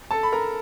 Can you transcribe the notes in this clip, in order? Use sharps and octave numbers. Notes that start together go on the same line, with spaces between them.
A4 A5
B5
A#4 A#5